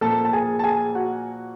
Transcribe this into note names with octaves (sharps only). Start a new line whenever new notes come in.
A#2 F3 A#3 A4 A5
A5
G#4 G#5
A5
G#4 G#5
F#4 F#5